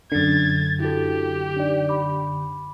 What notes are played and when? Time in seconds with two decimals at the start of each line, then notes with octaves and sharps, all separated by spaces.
0.12 F#2 D3 G#6 A6
0.80 E4 F#4 G4 A4
1.56 D4 D#4 D5
1.89 B5 D6